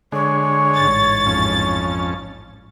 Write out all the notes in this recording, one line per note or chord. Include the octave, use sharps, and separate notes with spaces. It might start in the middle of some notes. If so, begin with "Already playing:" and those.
D3 G#3 C#5
A1 G#2 A6
F2 C#4